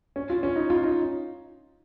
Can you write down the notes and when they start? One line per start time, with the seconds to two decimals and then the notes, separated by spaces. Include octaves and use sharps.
0.16 C#4
0.30 F4
0.43 C#4
0.56 D#4
0.70 F4
0.84 D#4